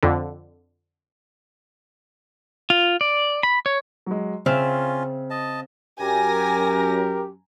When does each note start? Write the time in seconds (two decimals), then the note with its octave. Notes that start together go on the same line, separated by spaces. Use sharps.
0.03 F2 D3
2.70 F4
3.01 D5
3.43 B5
3.66 C#5
4.06 F#3 G#3
4.46 C#3 C4 C#4 F4 E5 F5
5.30 D#5 A5
6.00 F#2 G4 A#4 G#5 A#5 A#6